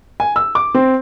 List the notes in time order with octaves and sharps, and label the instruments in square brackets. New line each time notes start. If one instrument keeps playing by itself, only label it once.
[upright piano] G#5
E6
D6
C4